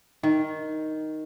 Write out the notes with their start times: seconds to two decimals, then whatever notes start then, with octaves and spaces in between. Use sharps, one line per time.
0.23 D#3